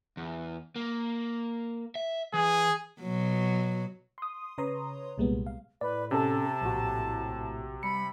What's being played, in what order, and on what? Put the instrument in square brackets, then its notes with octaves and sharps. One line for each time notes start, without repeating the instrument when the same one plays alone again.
[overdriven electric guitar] E2
A#3
E5
[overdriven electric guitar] E3 [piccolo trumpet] G#4
[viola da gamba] B2 F#3
[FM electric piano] C6 D#6
C#3 B4 C#5 A#5 C6 D#6
C2 A#2 G3 G#3 B3
F5
[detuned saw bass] A2 [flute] B4 [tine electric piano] D5
[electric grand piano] C3 [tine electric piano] C#4 A4 [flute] A5
[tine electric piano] A#1 F#4 [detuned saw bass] A2
[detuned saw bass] G3 [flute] B5 [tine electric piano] C#7